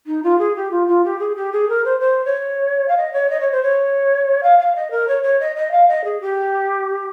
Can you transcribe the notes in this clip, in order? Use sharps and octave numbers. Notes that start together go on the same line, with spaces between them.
D#4
F4
G#4
G4
F4
F4
G4
G#4
G4
G#4
A#4
C5
C5
C#5
F5
D#5
C#5
D#5
C#5
C5
C#5
F5
F5
D#5
A#4
C#5
C#5
D#5
D#5
F5
D#5
G#4
G4